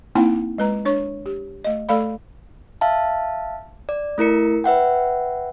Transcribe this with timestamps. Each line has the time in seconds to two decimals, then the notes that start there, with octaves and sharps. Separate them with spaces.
0.15 A#3 C4 D#4 E4 F#5 G5
0.58 G#3 B4 A#5
0.85 D4 C#5 C#6
1.26 G4
1.65 A3 D#5
1.89 A3 A4 D5 F5 B5
2.81 E5 F5 A5
3.89 D5
4.18 A3 E4 A#4 C#7
4.64 B4 E5 F#5 G5